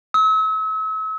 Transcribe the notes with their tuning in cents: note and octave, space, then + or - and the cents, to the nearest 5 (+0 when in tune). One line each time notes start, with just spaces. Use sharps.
E6 -40